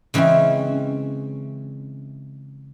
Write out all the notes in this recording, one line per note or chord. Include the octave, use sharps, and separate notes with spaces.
C#3 E3 G#3 C4 C#4